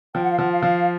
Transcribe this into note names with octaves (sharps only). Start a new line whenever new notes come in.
F3 G5
F#5
F5
F3 F#5
F5
F3